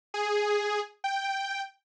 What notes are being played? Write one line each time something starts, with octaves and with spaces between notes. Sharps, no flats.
G#4
G5